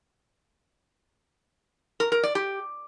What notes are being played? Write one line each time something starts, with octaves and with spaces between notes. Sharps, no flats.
A#4
A#4
D5
G4